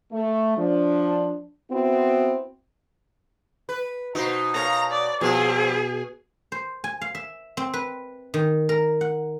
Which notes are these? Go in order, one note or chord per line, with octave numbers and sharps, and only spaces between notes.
A3
F3 D4
B3 C4 E4 F#4
B4
B2 D#4 F#4 C5 C6
A#4 C#5 F5 A#5
D5
B2 F3 G3 C4 G#4
C5
G#5
F5
E5
C4
B4
D#3
A#4
F#5